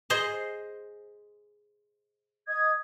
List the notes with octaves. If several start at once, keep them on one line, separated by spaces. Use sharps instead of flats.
G#4 C5 D#5
D#5 D#6 G#6